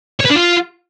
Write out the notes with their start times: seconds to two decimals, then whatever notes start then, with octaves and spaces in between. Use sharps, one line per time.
0.21 C#5
0.26 B4
0.31 D4
0.36 F4